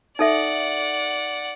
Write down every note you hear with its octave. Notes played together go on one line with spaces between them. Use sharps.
D#4 A4 D5 E5 F#5